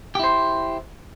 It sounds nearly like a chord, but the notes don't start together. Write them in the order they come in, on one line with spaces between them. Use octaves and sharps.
G4 E4 C5